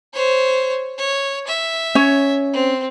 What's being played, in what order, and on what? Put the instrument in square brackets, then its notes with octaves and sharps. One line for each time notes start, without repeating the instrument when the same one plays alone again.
[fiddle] C5 C#5
C#5
E5
[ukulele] C#4 C#5
[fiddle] C4